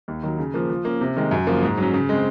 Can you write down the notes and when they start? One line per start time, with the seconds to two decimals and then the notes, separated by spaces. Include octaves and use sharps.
0.08 D#2
0.23 D#3 F#3
0.38 C#3
0.54 F3 A#3
0.70 F3
0.85 A#3 C#4
1.01 C3
1.16 D#3 G#3
1.31 F#2
1.47 C#3 F3 A#3 F4
1.63 G#2
1.77 F#3 C#4
1.94 C#3
2.09 G#3 C4